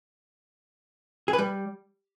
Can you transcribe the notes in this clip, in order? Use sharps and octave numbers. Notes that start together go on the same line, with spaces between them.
G#4
B4
G3